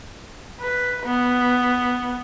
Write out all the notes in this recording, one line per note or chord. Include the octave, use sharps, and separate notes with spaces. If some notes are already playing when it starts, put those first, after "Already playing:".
B4
B3